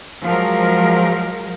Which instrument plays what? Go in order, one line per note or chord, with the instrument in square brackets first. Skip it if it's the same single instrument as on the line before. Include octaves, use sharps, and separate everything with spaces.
[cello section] F3 F#3 G#3 A#4